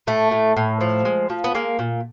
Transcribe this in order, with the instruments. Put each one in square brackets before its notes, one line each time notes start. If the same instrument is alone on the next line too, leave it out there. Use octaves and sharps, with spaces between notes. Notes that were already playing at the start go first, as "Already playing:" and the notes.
[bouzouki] A2 A3
A2
A2
F3
G#3
F3
B3
G#3 A#3
A#2